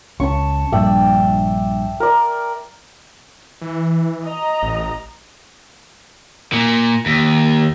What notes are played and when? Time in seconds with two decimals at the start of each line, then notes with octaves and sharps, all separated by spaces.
0.20 C#2 C#4 A5 C#6
0.72 A#1 G2 D5 E5 G5
2.00 A#4 D5
3.62 E3
4.24 D#5 A#5
4.63 A1
6.53 A#2
7.06 D#2